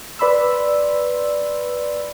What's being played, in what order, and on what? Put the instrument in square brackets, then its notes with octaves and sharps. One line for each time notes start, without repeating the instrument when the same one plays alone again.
[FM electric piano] B4 D5 B5 C6 E6